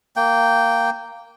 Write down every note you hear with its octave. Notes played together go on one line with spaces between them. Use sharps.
A#3 G5